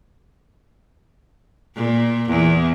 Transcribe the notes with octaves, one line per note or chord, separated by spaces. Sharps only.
A#2
E2